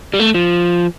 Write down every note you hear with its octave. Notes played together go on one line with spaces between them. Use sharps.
G3
A3
F3